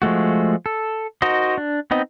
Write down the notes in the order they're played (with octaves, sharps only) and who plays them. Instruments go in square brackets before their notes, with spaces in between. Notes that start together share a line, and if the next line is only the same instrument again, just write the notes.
[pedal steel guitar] F3 G#3 A3 F#4
A4
D#4 F#4 A#4 C5 D#5
D4
B3 C4 D#4 D#5